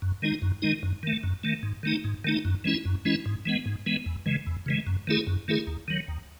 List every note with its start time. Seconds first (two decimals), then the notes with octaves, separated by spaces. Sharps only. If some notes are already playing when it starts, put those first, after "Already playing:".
0.02 F#2
0.22 D#3 G#3 D#4
0.42 F#2
0.62 D#3 G#3 D#4
0.83 F#2
1.03 D#3 A3
1.23 F#2
1.43 D#3 A3
1.63 G#2
1.83 D#3 A3 D#4
2.04 G#2
2.24 D#3 A3 D#4
2.45 F#2
2.64 E3 G#3 C#4 E4
2.85 F#2
3.05 E3 G#3 C#4 E4
3.26 G#2
3.45 E3 G#3 B3
3.66 G#2
3.86 E3 G#3 B3
4.06 E2
4.26 C#3 E3 G#3
4.47 E2
4.66 C#3 E3 G#3
4.87 F#2
5.07 D#3 A3 E4 G#4
5.27 F#2
5.48 D#3 A3 E4 G#4
5.67 D#2
5.88 D#3 F#3
6.08 D#2